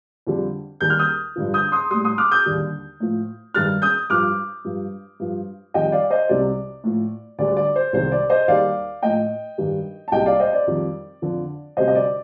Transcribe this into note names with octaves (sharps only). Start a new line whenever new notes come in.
F2 D3 G3
D#2 D#3 G3 G6
F6
D#6 G6
G2 D3 F3
D#6 G6
C6 D#6
A2 G3 C6 D#6
C6 D#6
D6 F6
D#6 G6
D#2 D3 G3
A2 F3
G2 D#3 G3 F6 A6
D#6 G6
G2 F3 D6 F6
G2 F3
G2 F3
F2 D#3 G3 D#5 G5
D5 F5
C5 D#5
C2 C3 G3 D5
A2 F3
D2 D3 G3 D5
D5
C5
C2 C3 D#3 G3 C5
D5
C5 D#5
D#2 D#3 G3 D5 F5
A2 F3 D#5 G5
G2 D#3 G3
A5
C2 A#2 G3 D#5 G5
D5 F5
C5 D#5
D5
F2 D#3 G3
F2 D3 F3
D2 C3 G3 C5 D#5
D#5
D5